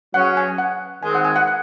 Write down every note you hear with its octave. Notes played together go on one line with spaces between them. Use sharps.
F#3 C#4 G#4 F#5
G#5
F#5
D#3 G#3 C4 G#5
F#5
G#5
F#5
F#5